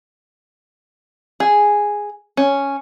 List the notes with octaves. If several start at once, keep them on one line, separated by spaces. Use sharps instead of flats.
G#4
C#4